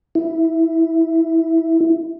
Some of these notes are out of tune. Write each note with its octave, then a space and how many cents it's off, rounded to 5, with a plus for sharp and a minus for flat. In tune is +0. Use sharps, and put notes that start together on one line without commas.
E4 +0